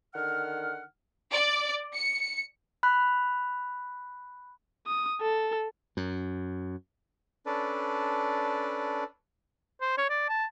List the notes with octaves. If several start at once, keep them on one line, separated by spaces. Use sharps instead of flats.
D3 D#3 F#5 F6
D5
C#7
B5 F#6
D#6
A4
F#2
C#4 D4 A4 B4 D5
C5
C#5
D5
A5